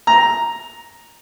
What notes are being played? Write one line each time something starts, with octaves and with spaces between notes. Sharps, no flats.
A#5